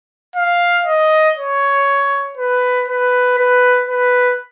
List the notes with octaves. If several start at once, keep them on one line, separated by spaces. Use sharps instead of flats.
F5
D#5
C#5
B4
B4
B4
B4